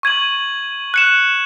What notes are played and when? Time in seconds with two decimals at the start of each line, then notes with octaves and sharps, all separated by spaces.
0.03 C#6 G#6 D#7 F#7
0.94 F#6 C#7 E7